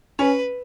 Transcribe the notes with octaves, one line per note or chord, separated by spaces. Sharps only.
C#4 B4